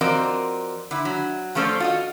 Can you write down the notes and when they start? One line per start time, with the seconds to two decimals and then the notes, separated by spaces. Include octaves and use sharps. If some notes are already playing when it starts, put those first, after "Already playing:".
0.01 F3 C4 F#4 A#4 D5 D#5
0.91 D3 E4
1.05 F#3
1.55 F3 A3 C#4 A4 C5 D5
1.80 F4 F#4 D#5